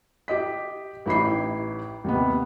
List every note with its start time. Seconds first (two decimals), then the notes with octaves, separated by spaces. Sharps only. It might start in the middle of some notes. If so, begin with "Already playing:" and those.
0.28 G4 D#5 B6
1.06 A1 D#4 E4 G4 B5 C7
2.04 D#2 C3 B3